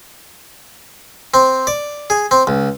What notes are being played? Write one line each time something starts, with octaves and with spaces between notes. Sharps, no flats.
C4
D5
G#4
C4
C#2